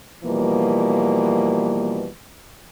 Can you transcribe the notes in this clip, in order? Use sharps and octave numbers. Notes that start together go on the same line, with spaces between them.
B2 E3 F3 G3 A#3